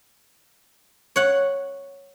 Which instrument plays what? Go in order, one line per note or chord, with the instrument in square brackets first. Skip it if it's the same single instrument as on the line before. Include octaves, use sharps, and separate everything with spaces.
[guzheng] C#5 F#5